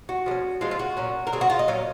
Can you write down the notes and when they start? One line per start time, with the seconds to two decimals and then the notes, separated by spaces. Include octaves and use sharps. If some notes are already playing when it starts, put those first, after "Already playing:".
0.09 F#4
0.26 F3 G#3
0.31 C#4
0.61 F3 G#3 C4 F4
0.71 F4
0.79 F#4
0.97 A#2 F#3 C#4
1.27 A#4
1.33 C#3 F#3 C4 G#4
1.41 F#4
1.50 F4
1.59 D#5
1.68 A#2 F#3 C#4 F5